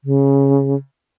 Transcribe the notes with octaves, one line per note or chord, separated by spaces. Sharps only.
C#3